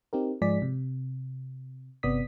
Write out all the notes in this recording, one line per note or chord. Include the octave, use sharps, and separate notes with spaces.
C4 D#4 G4 A#4
G#2 F3 G#3 G#4 D5 B6
C3
G1 C3 B3 D5 D#6 B6